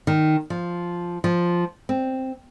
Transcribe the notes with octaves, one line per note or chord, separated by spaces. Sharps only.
D#3
F3
F3
C4